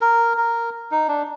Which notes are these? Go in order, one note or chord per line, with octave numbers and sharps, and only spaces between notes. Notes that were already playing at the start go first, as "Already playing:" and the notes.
A#4
A#4
D#4
D4